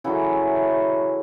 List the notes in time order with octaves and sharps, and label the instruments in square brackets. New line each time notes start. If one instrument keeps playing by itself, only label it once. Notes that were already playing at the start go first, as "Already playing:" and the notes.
[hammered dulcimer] C#3 E3 F#3 A3 E4